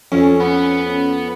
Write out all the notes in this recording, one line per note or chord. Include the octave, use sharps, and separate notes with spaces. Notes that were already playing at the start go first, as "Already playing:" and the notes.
F2 C#4
B3